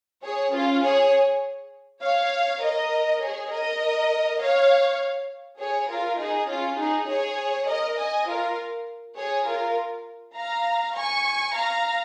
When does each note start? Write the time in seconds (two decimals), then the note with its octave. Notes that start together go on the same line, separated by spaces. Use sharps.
0.24 G#4 C#5
0.53 C#4 F4
0.83 G#4 C#5
2.02 C#5 F5
2.62 A#4 D#5
3.22 G#4 C#5
3.51 A#4 D#5
4.41 C#5 F5
5.59 G#4 C#5
5.89 F4 A#4
6.19 D#4 G#4
6.49 C#4 F4
6.78 D#4 G#4
7.09 G#4 C#5
7.68 A#4 D#5
7.98 D#5 G#5
8.28 F4 A#4
9.17 G#4 C#5
9.47 F4 A#4
10.36 F5 A#5
10.96 G#5 C#6
11.55 F5 A#5